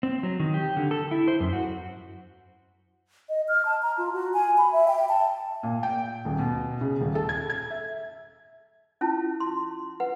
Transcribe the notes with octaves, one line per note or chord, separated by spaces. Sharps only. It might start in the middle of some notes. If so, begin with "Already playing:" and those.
C4
F#3
D#3
G4
D3
A4
E4
C5
F#2
F#4
D#5
F6
A5
A#5
F4
F#4
G#5
B5
E5
G5
A5
A#2
G5
D#1
B2
C#3
D#1
A4
G#6
G#6
E5
C#4 E4 F4 A5
C6
B4 F#5